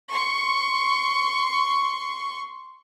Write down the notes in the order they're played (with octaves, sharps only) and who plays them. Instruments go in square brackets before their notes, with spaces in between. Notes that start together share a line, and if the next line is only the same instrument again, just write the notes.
[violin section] C6 C#6